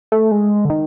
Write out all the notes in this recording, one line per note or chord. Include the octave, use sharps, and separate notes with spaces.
A3
G#3
D3
D#3